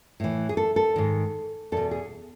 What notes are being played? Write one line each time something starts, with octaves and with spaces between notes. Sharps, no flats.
A2 E3
G#4
A4
A4
G#2 D#3
E2 B2 A4
G#4